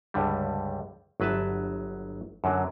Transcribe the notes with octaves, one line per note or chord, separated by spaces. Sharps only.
C#2 G2 D3 G3
G1 F#3 B4 E5 A5
F#2 D3 F#3